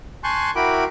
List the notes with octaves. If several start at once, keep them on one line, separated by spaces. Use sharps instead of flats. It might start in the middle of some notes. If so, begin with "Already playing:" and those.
G#5 A5 C6 C#6 F#6 G6
E4 F#4 A#4 G5 B5 D6